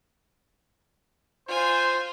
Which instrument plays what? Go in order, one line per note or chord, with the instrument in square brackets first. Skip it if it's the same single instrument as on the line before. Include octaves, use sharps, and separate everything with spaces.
[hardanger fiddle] F4 G#5 [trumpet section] C5